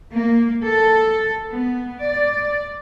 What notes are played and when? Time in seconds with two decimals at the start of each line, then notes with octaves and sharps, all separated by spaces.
0.12 A#3
0.66 A4
1.50 B3
2.05 D5